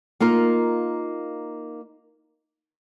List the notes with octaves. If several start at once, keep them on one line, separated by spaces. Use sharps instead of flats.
A#3 D#4 F4 A#4